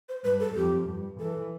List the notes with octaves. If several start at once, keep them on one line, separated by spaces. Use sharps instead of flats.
C5
G2 B4
A4
F2 G4
G2
E3 A4